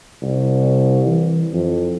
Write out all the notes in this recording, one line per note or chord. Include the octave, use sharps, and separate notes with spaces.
C2
E3
F2